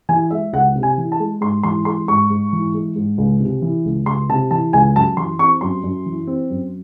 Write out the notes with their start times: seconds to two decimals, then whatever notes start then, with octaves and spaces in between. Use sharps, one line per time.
0.09 E3 G#5
0.31 G#3 E5
0.53 C#2 F#5
0.76 C3
0.83 G#5
0.98 E3
1.12 A5
1.20 G#3
1.41 G#2 C6
1.63 E3 C6
1.85 G#3 C6
2.08 G#2 C#6
2.30 G#2
2.53 E3
2.74 G#3
2.96 G#2
3.18 C#2
3.40 C3
3.62 E3
3.85 C#2
4.06 C#2 C6
4.30 C3 A5
4.51 E3 A5
4.73 C#2 G#5
4.96 F#2 A5
5.17 E3 C6
5.39 C4 C#6
5.61 F#2 C6
5.84 F#2
6.06 E3
6.27 C4
6.50 F#2